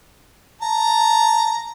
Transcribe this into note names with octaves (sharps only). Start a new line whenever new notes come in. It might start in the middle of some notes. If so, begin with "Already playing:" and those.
A5 A#5